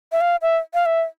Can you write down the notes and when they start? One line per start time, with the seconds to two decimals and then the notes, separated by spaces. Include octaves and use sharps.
0.12 E5
0.21 F5
0.42 E5
0.74 F5
0.86 E5